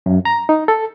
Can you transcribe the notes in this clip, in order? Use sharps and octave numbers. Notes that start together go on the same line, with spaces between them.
F#2
A#5
D#4
A4